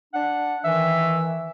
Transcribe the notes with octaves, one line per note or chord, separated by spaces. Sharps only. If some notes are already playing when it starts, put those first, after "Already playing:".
D4 F#5
D#3 E3 E5